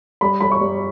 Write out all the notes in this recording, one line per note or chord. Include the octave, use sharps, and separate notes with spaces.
G3 B5
G3 B5
C#6
G3